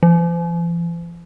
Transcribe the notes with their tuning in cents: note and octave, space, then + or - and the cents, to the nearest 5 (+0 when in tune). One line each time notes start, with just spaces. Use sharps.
F3 -45